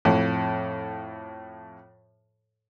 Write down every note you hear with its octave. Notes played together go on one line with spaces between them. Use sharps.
F2 A2